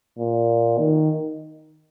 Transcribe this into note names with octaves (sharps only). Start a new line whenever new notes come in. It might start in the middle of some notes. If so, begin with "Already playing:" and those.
A#2
D#3